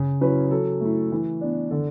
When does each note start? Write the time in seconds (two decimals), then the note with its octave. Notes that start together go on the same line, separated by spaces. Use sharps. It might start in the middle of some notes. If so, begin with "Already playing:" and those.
Already playing: C#3
0.21 F#3 C#4 E4 B4
0.51 F#3 A4
0.81 A3 E4
1.12 E3
1.41 B3 D4
1.71 D3 A4